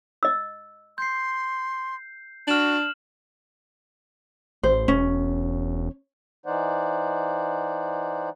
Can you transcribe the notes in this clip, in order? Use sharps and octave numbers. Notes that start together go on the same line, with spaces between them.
D#5 E6
C6 G6 C7
D4 F#4 F6 E7 F#7
A1 C5
E1 C#4
E3 D#4 C5 D5 F#5